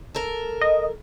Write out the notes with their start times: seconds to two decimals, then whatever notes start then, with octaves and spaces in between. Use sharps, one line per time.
0.15 A4 A#4
0.61 D#5